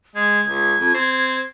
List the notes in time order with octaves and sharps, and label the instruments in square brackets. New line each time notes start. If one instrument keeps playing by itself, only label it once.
[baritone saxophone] G#3 [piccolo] G#6
[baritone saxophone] C#2 [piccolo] G#6
[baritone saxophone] F2
C4